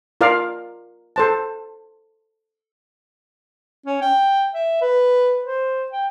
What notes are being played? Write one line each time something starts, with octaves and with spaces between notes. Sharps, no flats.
F4 A#4 D5 F5
A4 C5 A5
C#4
G5
E5
B4
C5
G5